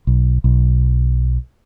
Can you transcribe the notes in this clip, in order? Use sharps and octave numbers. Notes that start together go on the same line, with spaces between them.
B1
B1